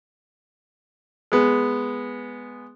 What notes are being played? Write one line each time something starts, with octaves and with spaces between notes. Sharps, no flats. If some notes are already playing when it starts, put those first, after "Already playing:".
G#3 B3